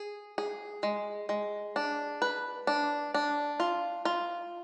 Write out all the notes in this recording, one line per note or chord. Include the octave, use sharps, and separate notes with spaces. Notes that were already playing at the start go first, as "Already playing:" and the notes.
Already playing: G#4
G#4
G#3
G#3
D4
B4
D4
D4
F4
F4